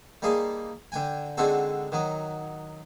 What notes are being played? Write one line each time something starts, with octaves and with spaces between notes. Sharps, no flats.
G3 A#3 D#4 G#4 A5 C6
D3 G5 G#5
D3 G#3 C4 D#4 F#4 A4
D#3 F#3 D#4